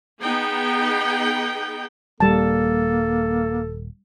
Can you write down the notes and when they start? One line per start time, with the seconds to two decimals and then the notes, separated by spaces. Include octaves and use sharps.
0.21 B3 D#4 G#4 G5
2.20 D#1 G3 A#3 A4 A5